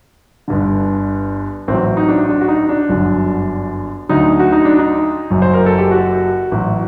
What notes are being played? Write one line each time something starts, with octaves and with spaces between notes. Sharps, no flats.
G1 G2 D3
A1 A2 F#3 C4
D#4
D4
D4
F#4
D#4
D4
G1 F#2 D3 F#3
D2 D3 F#3 D#4
F#4
D#4
D4
D#4
F#1 F#2 F#3
C5
A#4
A4
G4
F#4
A1 A2 F#3